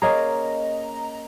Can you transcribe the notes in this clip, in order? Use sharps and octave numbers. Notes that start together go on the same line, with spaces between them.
A#3 C#4 G#4 D#5 A#5